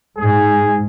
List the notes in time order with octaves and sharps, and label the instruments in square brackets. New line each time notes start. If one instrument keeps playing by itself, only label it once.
[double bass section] G#2 [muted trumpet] G#4